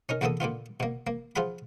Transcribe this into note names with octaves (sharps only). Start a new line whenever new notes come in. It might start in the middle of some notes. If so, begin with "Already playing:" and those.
C#4 D#4 A#4
E2 D3 A#3 B3 A4 D#6
A#2 D3 B3 F4
B2 A#3
A#3
F3 F4 G#4 F#5 B5